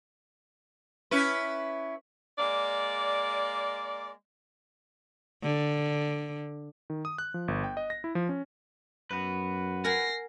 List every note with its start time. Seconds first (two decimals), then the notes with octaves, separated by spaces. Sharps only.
1.11 C#4 E4 B4
2.39 G#3 A#3 D5
5.43 D3
6.90 D#3
7.05 D#6
7.18 F#6
7.34 F3
7.48 G1
7.64 G5
7.77 D#5
7.90 A#6
8.04 E4
8.15 F3
8.29 C#4
9.11 F#2 F#4 B4
9.84 A#4 F#5 G#5 A#6 C7